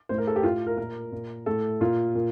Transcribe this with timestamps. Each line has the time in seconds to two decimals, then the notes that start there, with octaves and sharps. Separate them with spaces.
0.09 A2 C5
0.18 A#4
0.27 A4
0.36 G4
0.43 A2 F4
0.67 A#4
0.77 A#2 A#4
1.12 A#2
1.46 A2 A4
1.81 A#2 F4
2.15 A#2